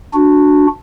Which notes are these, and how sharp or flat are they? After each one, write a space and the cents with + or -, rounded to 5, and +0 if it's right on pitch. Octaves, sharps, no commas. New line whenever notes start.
D4 +0 F#4 -10